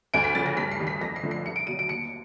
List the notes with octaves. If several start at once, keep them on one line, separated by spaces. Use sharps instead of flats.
D2 D7
B6
C#3 F3 A6
A#6
G2 B6
C7
D#3 G3
B6
F2 A#6
C7
D3 F3 A3
C7
C2 C#7
D7
B2 F#3 D#7
D7
D#2 C#7